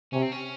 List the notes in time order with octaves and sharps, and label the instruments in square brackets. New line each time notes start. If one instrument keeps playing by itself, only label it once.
[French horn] C3 [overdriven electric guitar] C#4
[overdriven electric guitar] C4
C#4